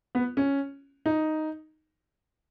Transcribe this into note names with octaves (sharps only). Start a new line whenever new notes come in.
B3
C#4
D#4